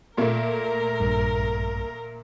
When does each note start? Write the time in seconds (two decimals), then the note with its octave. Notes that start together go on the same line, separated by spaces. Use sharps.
0.17 A#2 A3 A#3 A#4
1.00 A#1 G2